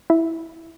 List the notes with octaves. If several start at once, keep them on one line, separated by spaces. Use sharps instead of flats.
E4 E5